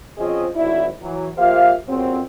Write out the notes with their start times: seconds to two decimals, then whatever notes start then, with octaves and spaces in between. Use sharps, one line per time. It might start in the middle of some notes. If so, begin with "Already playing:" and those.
0.18 F3 C4 C#4 G#4 D#5
0.55 G#1 D2 F#3 D4 E4
1.02 E3 F#3
1.38 F3 A#3 G4 C5 E5 F5
1.88 F2 A#2 C#3 F#3 C4